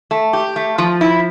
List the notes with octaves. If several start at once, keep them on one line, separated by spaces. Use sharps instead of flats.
A3
G4
A3
F3
E4